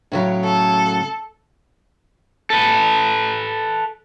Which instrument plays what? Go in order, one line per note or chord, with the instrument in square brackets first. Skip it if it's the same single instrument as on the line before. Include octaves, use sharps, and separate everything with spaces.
[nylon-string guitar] A2 C#3 F#3
[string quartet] A4
[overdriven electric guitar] A4 B4